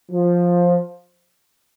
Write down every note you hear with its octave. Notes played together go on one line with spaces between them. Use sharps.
F3